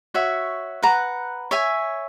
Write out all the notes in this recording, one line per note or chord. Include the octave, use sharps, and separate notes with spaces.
F#4 C#5 E5
B4 F#5 A#5
C#5 E5 G#5